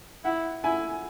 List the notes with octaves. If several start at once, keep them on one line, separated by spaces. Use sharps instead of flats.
E4 F#5
E4 G#5